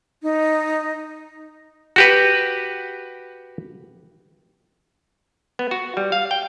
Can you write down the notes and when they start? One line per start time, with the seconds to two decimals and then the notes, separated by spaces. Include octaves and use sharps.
0.23 D#4
1.96 F#4 G4 B4
5.59 B3
5.71 F#4
5.97 G3
6.12 F5
6.31 G5